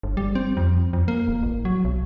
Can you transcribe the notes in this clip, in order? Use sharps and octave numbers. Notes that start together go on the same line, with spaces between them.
G1
G3
C4
F2
F2
A#3
D#1
A1
F#3
B1